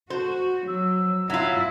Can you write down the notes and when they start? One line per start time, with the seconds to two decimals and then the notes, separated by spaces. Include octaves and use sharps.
0.10 F#4 C5
0.68 F#3 E6
1.30 F#3 E4 F4